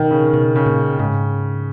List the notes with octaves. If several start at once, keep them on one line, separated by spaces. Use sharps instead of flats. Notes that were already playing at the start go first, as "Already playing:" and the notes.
Already playing: B2 D#3
C#3
B2
C#3
A#2
G#2 C#3